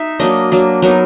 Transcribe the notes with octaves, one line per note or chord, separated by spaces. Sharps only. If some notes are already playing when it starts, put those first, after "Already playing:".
Already playing: D#4 E5
F#3 A#3 D4 D#5
F#3 A#3 D4
F#3 B3 D#4 A#4